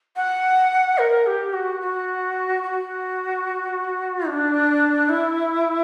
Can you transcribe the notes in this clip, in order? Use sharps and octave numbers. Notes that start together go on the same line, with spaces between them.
F#5
A#4
G4
F#4
F#4
F#4
D4
E4